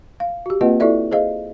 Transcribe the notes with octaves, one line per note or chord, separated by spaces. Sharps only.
F5
F#4 G4
A#3 C4 F4 B4 D#5 F#5
E4 F#4 A4 D5 E5
G#4 C5 D#5 F5